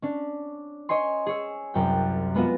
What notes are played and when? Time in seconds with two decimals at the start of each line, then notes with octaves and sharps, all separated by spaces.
0.02 C#4 D4
0.89 C#5 D#5 G#5 C6
1.26 G#4 C#5 E6
1.74 C2 F#2 G5
2.35 G#3 B3 F4 F#4